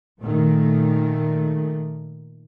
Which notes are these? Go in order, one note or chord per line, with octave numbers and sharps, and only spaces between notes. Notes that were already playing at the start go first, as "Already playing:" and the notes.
A#2 D#3 A3